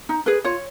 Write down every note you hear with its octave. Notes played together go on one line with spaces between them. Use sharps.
D#4
G#4 B4
F4 C#5